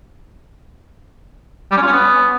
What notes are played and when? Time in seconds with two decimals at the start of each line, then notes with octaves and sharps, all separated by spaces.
1.72 G3
1.77 C#4
1.82 F4
1.87 C#4
1.92 B3